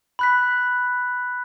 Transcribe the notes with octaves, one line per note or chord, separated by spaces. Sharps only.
B5 F#6 B6